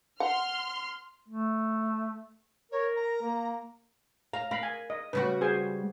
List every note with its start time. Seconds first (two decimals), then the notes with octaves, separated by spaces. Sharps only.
0.20 F#5 C6 F6
1.29 A3
2.72 A#4 C#5
2.96 A#5
3.23 A#3
4.34 F5 A#5
4.51 A#4 F5 B5
4.63 G#5
4.90 D#5
5.13 C#3 G3 F#4 B4
5.41 G#4 C5 G#5